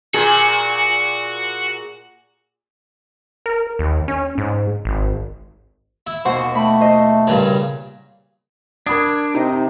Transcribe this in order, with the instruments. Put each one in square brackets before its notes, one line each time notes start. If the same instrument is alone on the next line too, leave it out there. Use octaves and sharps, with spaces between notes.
[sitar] A#2 G#4 [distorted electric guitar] F#4
[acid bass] A#4
D#2
C#4
G#2
G#1
[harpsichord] E4
[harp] D#2 B2 [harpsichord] F#4 [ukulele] C5
[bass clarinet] A3 [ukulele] G5 [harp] B5
[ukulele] C5 D#5 E5
[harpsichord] G2 A#2 C#3
[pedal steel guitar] D4 [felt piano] A#4 B5 D#6 [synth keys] G#6
[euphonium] C3 [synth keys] D#4